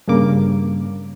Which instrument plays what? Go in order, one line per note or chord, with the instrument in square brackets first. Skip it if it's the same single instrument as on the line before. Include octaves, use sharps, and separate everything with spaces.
[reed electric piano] G2 C#3 A#3 D6